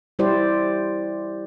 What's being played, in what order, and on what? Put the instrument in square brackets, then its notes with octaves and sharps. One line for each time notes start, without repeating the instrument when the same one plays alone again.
[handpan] G3 E4 G4 C5 D5